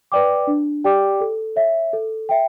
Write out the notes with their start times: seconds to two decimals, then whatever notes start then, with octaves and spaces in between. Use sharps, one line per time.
0.12 B4 D5 G5 D6
0.47 D4
0.84 G4 D5 G5 D6
1.21 A4
1.56 C#5 E5
1.93 A4
2.29 E5 G5